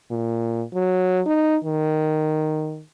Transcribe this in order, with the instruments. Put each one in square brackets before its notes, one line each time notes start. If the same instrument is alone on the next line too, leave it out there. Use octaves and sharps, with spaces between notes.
[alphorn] A#2
F#3
D#4
D#3